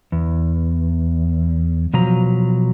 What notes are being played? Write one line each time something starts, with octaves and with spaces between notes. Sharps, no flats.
E2
B2 F3 F#3 A#5